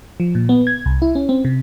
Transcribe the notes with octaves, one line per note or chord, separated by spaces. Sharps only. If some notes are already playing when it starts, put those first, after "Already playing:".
F3
A#2
B3
G#6
C2
E4
C#4
C4
C3